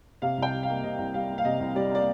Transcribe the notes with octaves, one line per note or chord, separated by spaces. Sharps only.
C3 F5
C2 G5
G3
F5
A#3
C3 D#5
C2
G3 F5
A#3
F5
C3 D#5
C2
G3 D5
A#3 D5